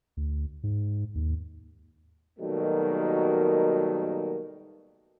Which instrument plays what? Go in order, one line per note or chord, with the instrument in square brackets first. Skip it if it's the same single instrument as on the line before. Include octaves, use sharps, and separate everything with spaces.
[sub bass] D2
G#2
D#2
[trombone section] B2 D#3 F#3 G3 A3 A#3